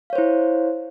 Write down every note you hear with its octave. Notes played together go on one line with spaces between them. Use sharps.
E4 C5 C#5 F5